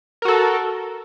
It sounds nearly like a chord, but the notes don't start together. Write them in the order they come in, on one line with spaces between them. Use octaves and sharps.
A#4 F#4 A4